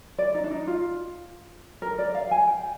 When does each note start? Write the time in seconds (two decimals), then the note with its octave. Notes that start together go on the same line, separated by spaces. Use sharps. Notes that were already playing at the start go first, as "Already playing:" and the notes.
0.18 D5
0.35 D#4
0.44 D4
0.51 D#4
0.67 F4
1.82 A#4
1.99 D5
2.15 F5
2.31 G#5
2.47 G5